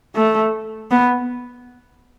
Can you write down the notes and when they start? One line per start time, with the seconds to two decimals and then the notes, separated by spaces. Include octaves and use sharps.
0.16 A3
0.91 B3